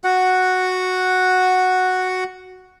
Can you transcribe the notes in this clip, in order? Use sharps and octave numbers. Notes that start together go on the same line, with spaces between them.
F#4 F#5